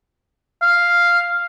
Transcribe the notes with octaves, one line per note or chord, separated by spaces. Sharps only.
F5